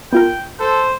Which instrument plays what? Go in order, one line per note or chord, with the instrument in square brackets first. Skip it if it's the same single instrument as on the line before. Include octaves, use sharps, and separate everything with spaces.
[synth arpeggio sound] B3 F4 A#4 [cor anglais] G5
[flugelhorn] A4 [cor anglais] C5